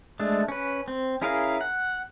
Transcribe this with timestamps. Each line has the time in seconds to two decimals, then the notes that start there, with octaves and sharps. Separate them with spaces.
0.20 G#3 A3 D4
0.48 C#4 B4
0.88 C4
1.22 C#4 E4 G#4 A#4 F5
1.61 F#5